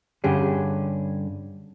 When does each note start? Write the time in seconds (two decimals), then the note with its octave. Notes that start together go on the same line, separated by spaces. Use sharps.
0.24 G2 D3 C#4 G4 G#4